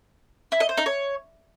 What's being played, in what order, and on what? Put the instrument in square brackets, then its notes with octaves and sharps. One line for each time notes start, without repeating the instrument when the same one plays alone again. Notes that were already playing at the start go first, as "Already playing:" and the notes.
[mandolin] E4
D#5
C5
D#4
C#5